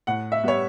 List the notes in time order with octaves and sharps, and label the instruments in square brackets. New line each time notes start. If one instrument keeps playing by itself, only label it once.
[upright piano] A2 F#5
E5
G3 B3 C#5